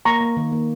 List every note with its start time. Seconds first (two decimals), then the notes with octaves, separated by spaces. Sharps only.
0.05 A#3 A#5 C#6
0.21 A#3
0.37 D#3
0.52 A#3